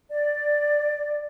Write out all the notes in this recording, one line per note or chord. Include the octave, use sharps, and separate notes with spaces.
D5